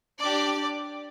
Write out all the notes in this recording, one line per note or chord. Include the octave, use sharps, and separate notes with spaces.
D4 G4 D5 D6